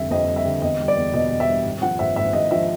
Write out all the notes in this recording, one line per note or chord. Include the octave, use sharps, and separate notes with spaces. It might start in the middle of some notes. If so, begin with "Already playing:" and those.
Already playing: F1 D3 G3 E5
F2 D#5
G3
E5
D3
E2 D#5
G3
D5
E2
B2 D#5
E2
E5
G3
G#1
F3 F#5
G#1 E5
G#2 E5
G#1 D#5
F3 E5